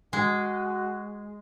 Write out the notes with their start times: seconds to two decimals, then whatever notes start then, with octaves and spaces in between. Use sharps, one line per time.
0.13 G#3 F#4